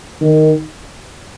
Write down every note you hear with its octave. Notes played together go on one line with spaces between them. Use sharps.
D#3